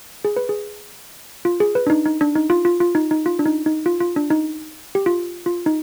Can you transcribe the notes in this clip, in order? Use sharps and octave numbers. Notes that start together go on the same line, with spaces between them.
G#4
B4
G#4
F4
G#4
B4
D4
D#4
D#4
D4
D#4
F4
F4
F4
D#4
D#4
F4
D4
D#4
D#4
F4
F4
D4
D#4
G4
F4
F4
D#4